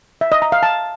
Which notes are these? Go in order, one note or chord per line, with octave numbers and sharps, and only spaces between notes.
E5
D#5
A#5
F5
A5